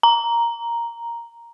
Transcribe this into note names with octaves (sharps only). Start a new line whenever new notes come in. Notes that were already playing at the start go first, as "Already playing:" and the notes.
A#5